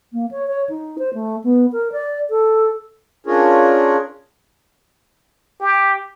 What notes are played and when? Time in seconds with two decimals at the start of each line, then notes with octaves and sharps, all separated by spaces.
0.13 A#3
0.31 C#5
0.47 C#5
0.69 D#4
0.99 C5
1.14 A3
1.44 B3
1.73 A#4
1.92 D5
2.30 A4
3.27 C#4 D4 F4 G#4 A#4 C#5
5.60 G4